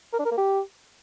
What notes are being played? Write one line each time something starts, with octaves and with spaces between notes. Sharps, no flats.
A#4
D4
A#4
A#3
G4